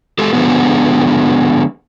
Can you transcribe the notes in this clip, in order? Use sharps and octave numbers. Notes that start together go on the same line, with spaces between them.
G#3 G4 A4
D3 F3 G#3 B3